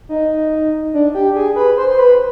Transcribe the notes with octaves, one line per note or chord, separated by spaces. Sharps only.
D#4
D4
G4
G#4
B4
C5
C5
B4